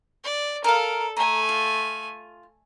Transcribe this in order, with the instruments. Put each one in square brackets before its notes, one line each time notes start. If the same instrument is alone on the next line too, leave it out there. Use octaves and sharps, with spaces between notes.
[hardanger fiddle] D5
[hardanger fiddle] A4 [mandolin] A#4 F5
[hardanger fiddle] A3 G#5 [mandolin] A#5
[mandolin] F4